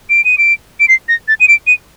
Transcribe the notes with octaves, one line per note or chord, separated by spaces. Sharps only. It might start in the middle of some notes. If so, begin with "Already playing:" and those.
D7
D#7
D7
D7
C7
A#6
A6
D#7
D7
D#7